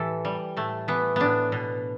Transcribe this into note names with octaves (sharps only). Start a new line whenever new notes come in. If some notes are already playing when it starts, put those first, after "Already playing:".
Already playing: A2 E3 G4 A4
G3
A2 A3
E3 B3
A2 B3 D4
B2